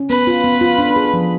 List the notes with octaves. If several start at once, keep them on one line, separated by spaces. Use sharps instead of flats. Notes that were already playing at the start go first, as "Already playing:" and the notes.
Already playing: C#4
B3 B4
F4
B3
F4
D4
G#4
F3